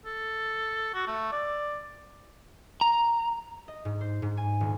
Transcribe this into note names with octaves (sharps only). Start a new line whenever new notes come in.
A4
F#4
A3
D5
A#5
D#5
G#2
C5
G#2
G#5
D#1